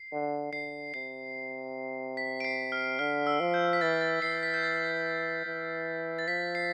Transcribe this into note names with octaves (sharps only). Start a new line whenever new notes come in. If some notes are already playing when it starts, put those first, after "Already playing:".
Already playing: C7
D3
D3 C7
C3 C7
B6
D7
C7
F6
D3 F6
E6
F3
G6
B6
E3 A6
A6
E3 C7
B6
G6
A6
E3
A6
F3 B6
C7